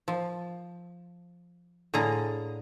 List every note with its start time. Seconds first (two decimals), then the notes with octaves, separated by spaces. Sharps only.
0.08 F3
1.94 A2 D3 G#4 F5 A#5